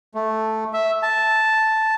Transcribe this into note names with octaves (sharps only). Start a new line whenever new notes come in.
A3
E5
A5